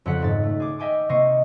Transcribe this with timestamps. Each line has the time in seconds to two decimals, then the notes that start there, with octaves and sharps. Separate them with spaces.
0.06 F2 C#3 G#4 F#5 B6
0.20 D#1 G#2 A6
0.43 A3
0.60 G#4 D6
0.79 D#5 E5 G5 G#5 D6
1.09 C3 A#3 D#5 C#6 C7